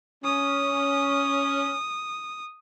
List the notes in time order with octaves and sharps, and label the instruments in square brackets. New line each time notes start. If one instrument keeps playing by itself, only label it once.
[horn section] C#4 [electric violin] D#6